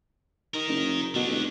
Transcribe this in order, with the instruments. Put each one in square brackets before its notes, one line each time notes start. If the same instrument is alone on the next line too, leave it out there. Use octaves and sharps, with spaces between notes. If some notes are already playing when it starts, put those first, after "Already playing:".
[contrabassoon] D#3 [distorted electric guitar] A#4 D#5
[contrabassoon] F#1
[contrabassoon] B2 [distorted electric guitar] A3 D4
[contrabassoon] F1